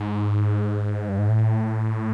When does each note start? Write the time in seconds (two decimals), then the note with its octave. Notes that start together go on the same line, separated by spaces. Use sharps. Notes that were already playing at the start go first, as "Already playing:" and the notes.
Already playing: G#2
1.09 G2
1.18 G#2
1.29 A2